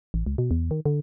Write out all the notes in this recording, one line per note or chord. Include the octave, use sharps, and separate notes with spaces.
A1
C#2
B2
E2
D#3
D3